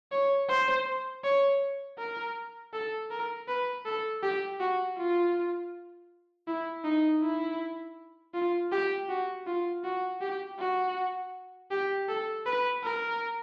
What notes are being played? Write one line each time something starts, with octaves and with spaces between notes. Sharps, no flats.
C#5
C5
C#5
A#4
A4
A#4
B4
A4
G4
F#4
F4
E4
D#4
E4
F4
G4
F#4
F4
F#4
G4
F#4
G4
A4
B4
A#4